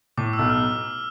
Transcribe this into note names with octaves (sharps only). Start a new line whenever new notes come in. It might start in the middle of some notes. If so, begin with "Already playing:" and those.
A2 D6
E6
B1
F6